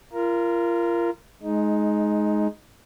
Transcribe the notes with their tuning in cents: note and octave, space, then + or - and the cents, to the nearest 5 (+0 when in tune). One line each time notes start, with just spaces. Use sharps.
F4 -30 A#4 +0
G#3 +20 D#4 +0